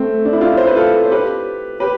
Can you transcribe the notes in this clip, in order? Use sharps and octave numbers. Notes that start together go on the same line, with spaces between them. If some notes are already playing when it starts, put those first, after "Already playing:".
Already playing: A3 C4
D4
E4
D4 F4
C5
B4
F4 A4
C5
G4 B4
G4 B4